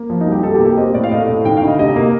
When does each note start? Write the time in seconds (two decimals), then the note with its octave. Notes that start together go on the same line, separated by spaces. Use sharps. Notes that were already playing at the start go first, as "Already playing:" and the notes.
Already playing: A#3
0.10 F3
0.21 D#4
0.26 C2
0.32 G4
0.43 C3 A4
0.55 G4
0.60 A#3
0.66 G4
0.77 C4 D#5
0.94 A2 D5
1.04 F5
1.11 A3 D#5
1.29 A2
1.45 D#3 G5
1.57 F5
1.62 D2 D#5
1.79 C3 D#5
1.96 A#3